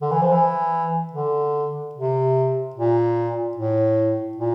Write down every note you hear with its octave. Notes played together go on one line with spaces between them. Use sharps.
D3
E3
F3
E3
D3
C3
A#2
A2
A#2